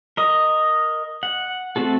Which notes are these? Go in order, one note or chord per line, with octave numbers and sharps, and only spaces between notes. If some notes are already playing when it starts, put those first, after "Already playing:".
A#4 D#5
F#5
A3 C4 F#4 A4